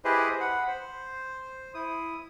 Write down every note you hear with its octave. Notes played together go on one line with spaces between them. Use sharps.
E4 G4 G#4 B4 C5 D#5
F#5 B5
C5
E4 D#6